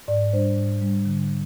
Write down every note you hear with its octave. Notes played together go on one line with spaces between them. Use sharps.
G#2 D5
G3 D4 C5
G#2
G3 D4
D3